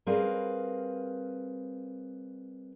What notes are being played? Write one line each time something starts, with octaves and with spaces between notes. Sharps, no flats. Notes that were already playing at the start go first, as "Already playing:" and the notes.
G3 C4 G#4 A#4 B4 F5